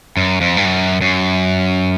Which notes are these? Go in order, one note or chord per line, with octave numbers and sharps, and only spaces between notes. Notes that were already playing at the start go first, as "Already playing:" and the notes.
F#2
F2
G2
F#2
F#2